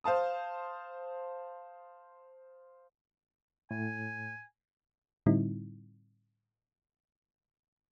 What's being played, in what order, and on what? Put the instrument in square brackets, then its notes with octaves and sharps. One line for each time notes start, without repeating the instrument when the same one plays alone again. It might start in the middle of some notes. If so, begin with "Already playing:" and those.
[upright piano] C5 F5 A5 D#6
[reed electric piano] A2 [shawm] G#5
[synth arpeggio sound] A2 D3 G3 C4 D#4 E4